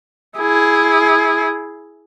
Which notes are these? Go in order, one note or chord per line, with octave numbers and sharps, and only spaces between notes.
E4 G#4